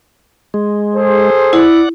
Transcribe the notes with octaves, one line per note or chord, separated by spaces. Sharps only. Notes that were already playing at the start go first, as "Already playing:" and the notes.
G#3
G#4 A4 C5
E4 D5 F#5